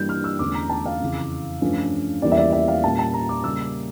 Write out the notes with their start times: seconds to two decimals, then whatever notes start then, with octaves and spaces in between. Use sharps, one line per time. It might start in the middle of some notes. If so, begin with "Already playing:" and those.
Already playing: G2 E3 G3 A#3 G6
0.09 F6
0.24 E6
0.39 E2 D3 A3 C#4 D6
0.54 A#5
0.70 A5
0.86 F5
1.00 F2 C#3 E3
1.61 G2 F3 A3 C#4
2.22 E2 E3 G3 A#3 C#4 D5
2.32 E5
2.37 D5
2.52 E5
2.68 F5
2.83 A#2 G3 C#4 A5
2.99 A5
3.14 A#5
3.29 D6
3.44 C#3 G3 A#3 C#4 E6